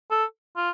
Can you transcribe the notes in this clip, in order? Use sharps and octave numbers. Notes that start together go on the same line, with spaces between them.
A4
F4